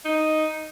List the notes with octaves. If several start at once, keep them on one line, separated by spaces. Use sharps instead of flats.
D#4